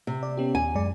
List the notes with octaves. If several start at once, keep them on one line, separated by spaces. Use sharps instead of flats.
C3
D5
B3 C#4 G4
D#2 G#5
F#2 G#3 D5